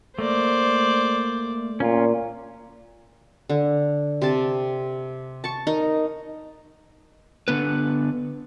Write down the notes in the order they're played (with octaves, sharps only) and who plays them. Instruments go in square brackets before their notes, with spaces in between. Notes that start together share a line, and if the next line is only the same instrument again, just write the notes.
[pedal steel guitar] A3 A#3 [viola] C5 D5
[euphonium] A#2 [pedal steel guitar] C#4 F4
[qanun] D3
C3 A5
A5 C#6
D#4 A#4
[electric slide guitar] D3 B3 B4